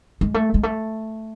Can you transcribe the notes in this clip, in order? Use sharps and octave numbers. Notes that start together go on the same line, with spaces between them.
G#3
A3
G#3
A3